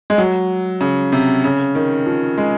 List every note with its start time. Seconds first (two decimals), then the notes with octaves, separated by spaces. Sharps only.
0.10 G#3
0.18 F#3
0.81 C#3
1.12 C3
1.44 C#3
1.75 D#3
2.06 F3
2.38 G#3